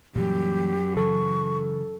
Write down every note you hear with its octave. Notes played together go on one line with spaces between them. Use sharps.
F#2 A#2 E3 G3 G4
C#3 E3 A4 C#6